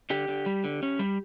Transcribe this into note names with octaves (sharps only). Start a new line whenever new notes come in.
D3 G4
D3
G3
D3
C#4
G3